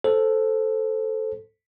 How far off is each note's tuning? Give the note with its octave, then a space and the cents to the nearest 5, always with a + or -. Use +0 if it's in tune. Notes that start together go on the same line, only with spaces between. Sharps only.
A4 +0 C5 +0